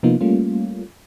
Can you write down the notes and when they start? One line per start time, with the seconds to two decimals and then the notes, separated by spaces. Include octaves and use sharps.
0.03 C3 F3 A#3 B3 D#4 F4
0.21 G3 A3 A#3 C#4 F4